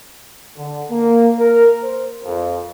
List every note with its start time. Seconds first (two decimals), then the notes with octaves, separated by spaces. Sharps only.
0.57 D3
0.90 A#3
1.39 A#4
1.83 C5
2.25 F2